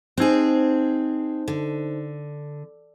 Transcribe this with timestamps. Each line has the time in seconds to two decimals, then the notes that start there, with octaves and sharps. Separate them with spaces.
0.17 C4 D#4 G#4 C5
1.48 D3